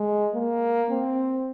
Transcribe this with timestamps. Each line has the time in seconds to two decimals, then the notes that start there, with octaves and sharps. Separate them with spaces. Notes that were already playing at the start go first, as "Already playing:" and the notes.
Already playing: G#3
0.34 A#3
0.90 C4